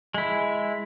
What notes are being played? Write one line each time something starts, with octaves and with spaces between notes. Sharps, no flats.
G#3 E4